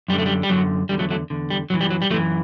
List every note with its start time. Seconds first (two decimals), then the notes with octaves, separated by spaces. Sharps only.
0.08 F#2 G3
0.13 D3
0.18 A3
0.26 G3
0.43 G3
0.49 F#2 D3 F#3
0.89 E2 D3 G3
0.99 F#3 A3
1.10 F#3 A3
1.30 E2 D3
1.50 G3
1.70 F#2 E3 F#3
1.81 G3
1.91 F#3
2.02 G3
2.10 F#2 E3 F#3 A3